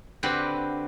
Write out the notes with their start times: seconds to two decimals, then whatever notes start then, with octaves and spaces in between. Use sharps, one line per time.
0.23 D3 C4 F#4 G4 B4 D5